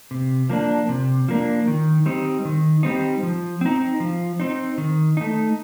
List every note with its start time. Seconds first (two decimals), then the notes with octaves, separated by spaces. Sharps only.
0.11 C3
0.50 F3 A#3 D4
0.89 C3
1.29 F3 A#3 D4
1.67 D#3
2.06 G3 C4 D#4
2.45 D#3
2.83 G3 C4 D#4
3.23 F3
3.61 C4 D#4
4.00 F3
4.40 C4 D#4
4.78 D#3
5.17 A3 D#4